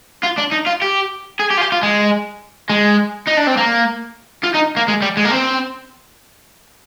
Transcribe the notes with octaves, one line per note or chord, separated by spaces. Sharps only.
F4
D4
D#4
F4
G4
G#4
G4
F4
G4
F4
G#3
G#3
D#4
D4
C4
A#3
F4
D#4
A#3
G#3
G3
G#3
A#3
C4